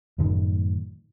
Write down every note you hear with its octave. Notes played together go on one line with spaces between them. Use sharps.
F#2 A2 D#3 A3